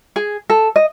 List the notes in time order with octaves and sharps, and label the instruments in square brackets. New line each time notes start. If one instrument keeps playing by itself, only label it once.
[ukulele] G#4
A4
D#5